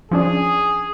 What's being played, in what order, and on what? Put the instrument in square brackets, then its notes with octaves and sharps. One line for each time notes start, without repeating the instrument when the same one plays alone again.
[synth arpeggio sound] F3 C#4 D4 [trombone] G#4